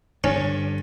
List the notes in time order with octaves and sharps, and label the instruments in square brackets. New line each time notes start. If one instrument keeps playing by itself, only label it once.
[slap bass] G2 D3 [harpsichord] C#4